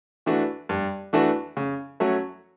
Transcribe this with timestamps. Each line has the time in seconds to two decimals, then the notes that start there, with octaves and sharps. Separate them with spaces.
0.26 E3 A3 D4 F#4
0.69 G2
1.13 E3 A3 D4 F#4
1.57 C#3
2.00 F#3 A3 C#4 F#4